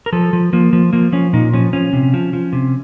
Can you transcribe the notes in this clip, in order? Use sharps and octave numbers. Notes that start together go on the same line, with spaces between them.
A#4
F3 A4
F3
F3 A#3
F3
F3 A#3
F3 C#4
A#2 D#4
F3 C#4
F3 C#4
C3
F3
F3
C3